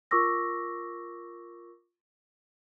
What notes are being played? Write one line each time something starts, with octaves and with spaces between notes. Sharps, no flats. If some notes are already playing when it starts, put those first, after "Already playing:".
F4 A#4 C#6 D6 E6 A#6